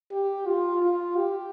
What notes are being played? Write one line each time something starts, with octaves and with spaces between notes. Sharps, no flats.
G4
F4
F4
G4